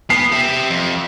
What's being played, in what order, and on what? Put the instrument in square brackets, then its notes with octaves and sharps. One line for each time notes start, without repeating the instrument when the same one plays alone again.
[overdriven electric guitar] B3 [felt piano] C7
[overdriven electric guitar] G4 E5
F2